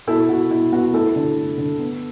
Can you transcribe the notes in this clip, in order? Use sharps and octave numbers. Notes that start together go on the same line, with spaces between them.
B2 E4 A4
B2 F#4
B2 E4
B3 F#4
A3 E4 A4
D3
A3
D3
B3